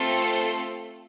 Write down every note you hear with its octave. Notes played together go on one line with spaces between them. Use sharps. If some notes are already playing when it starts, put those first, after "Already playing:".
Already playing: A3 C4 F4 A4
C6